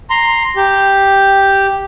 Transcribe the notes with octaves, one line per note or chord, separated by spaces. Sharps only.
A#5 C6
G4